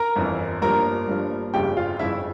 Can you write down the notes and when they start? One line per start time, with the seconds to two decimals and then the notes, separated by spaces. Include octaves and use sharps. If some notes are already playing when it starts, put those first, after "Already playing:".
Already playing: A#4 A#5
0.16 G1 F2 E3
0.62 G1 G2 F3 A#3 A#4 A#5
1.07 G1 G2 F3 A#3
1.54 G1 F2 C#3 G4 G5
1.77 F4 F5
1.99 G1 F2 C#3 E4 E5